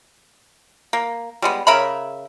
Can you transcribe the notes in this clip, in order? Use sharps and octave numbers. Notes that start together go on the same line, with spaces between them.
A#3
G3 G#3 B3
C#3 A#4 E5 B5